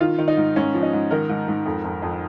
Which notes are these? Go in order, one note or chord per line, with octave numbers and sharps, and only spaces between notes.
D#3 F4
D#3
D#4
G#2
G#2 C#4
F3
D#4
G#2
D#3 A#4
G#2
G#2
F2
F2
F2